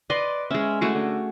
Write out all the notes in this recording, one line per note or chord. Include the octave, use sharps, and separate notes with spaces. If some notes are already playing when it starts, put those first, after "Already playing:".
B4 D5 D#5 C6
G#3 C#4 E5
A3 E4 F#4 G#4
D3